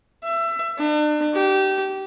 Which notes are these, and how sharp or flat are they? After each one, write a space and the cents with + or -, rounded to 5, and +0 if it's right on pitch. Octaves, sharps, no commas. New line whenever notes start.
E5 +25
D4 +40
G4 -25